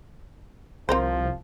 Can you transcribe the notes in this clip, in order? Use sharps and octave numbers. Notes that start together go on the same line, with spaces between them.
C2 F3 C4 A#4 C5